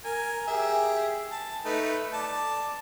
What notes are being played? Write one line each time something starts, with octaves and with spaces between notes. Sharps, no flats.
A#4 G#5
G4 G#4 E5
A5
A3 D#4 B4
D5 A5